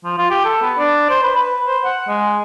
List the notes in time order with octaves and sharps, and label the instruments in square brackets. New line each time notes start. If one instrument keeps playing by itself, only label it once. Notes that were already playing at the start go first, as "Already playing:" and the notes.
[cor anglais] F3
F4
G4
A4
B3
D4
C5
B4
B4
C5
F#5
G#3